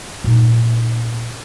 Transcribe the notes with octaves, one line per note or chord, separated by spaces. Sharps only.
A#2 D#4